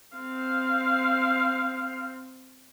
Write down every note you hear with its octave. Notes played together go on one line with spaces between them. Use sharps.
C4 F5